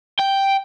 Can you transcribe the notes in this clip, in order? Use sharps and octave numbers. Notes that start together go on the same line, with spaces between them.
G5